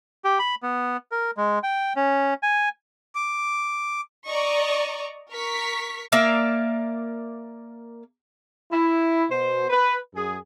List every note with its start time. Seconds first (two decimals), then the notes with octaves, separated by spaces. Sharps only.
0.24 G4
0.39 B5
0.63 B3
1.12 A#4
1.37 G#3
1.63 G5
1.96 C#4
2.43 G#5
3.15 D6
4.24 D5 D#5 A#5 C#6
5.30 A#4 C#6 B6
6.12 A#3 D5 E5 F5
8.72 E4
9.30 B2 C5
9.70 B4
10.15 F#2 G#4